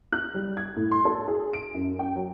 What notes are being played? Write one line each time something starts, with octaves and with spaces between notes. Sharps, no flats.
F#6
G3
G#6
A2
C6
A4
G#4
D7
F#2
G5
F#3